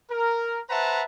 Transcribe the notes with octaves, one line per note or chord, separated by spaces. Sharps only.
A#4
B4 C5 E5 F#5 A5 A#5